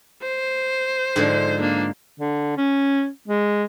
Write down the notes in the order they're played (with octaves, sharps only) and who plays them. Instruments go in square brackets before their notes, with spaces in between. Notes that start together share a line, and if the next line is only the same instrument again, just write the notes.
[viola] C5
[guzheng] G#2 D3 F3
[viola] A#3 D4
[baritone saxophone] D3
C#4
G#3